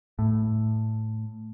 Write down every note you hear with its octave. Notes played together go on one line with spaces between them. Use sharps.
A2